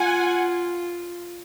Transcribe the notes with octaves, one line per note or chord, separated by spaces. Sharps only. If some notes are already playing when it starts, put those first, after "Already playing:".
Already playing: F4 F#5 G#5